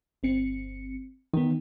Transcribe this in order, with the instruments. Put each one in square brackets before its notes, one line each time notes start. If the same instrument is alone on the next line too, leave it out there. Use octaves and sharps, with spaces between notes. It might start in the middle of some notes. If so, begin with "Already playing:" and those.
[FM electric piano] G1 C4 C#7
[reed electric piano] D#3 [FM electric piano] B3 D#4